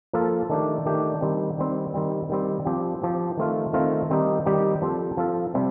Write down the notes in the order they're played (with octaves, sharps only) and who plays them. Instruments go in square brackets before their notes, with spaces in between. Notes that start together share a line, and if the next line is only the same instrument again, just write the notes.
[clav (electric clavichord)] F3 A#3 F4 A4
D#3 A3 D4 G4
D#3 A3 D4 G4
D#3 G3 C4
D#3 G3 C4
D#3 G3 C4
D#3 G3 C4
F3 C4 G4
F3 C4 G4
D#3 A3 C4 F4
D#3 A3 C4 F4
D#3 G3 C4 D#4 G4
D#3 G3 C4 D#4 G4
F3 C4 F4 A4
F3 C4 F4 A4
C3 G3 C4